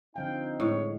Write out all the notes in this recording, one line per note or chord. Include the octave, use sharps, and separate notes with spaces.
D3 F3 C4 D#4 F5 G5
A2 G#3 C#5